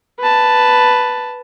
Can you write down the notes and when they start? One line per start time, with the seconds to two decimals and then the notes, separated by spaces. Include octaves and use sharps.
0.20 B4 A5